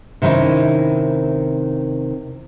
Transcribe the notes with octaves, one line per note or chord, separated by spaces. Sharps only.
C3 D#3 C#4 D#4 E4